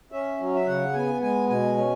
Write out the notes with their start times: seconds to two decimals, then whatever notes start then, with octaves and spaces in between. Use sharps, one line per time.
0.12 C#4 E5
0.40 F#3
0.55 E5
0.66 C#3 F#5
0.94 B3 G#5
1.21 G#3 G#5
1.49 B2 G#5
1.77 C#4